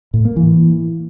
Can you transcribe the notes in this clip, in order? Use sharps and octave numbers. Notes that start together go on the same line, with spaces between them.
A2
A#3
E3